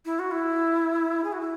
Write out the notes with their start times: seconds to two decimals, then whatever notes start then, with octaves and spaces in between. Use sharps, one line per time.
0.05 E4
0.19 F#4
0.31 E4
1.24 G#4
1.32 F#4
1.41 E4